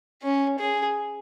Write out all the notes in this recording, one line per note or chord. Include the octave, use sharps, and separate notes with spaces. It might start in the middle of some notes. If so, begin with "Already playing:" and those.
C#4
G#4